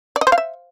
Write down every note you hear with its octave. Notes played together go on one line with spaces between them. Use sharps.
D5
D#5
C5
F5
E5